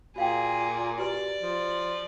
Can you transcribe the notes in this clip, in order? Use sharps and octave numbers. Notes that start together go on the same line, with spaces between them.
A#2 F#4 G#4 F5 G5
F#4 G4 B4 D5
F3